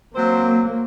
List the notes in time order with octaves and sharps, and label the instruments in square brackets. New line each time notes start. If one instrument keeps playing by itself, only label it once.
[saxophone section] F#3 C4 C5 [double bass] A#3